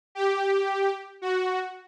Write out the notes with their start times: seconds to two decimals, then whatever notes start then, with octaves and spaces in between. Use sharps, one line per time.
0.15 G4
1.22 F#4